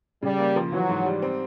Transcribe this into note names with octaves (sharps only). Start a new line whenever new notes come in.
C#3 G3
A#3
F3
E3 F#3
G#2
G3
C4